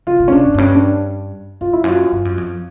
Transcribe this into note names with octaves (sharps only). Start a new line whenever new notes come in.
C#3 F4
C3
C#4
C3 D4
G2
F#2
G2 C#4
D4
F#2 F4
F2 E4
F#2 F4
G2
F#2
F2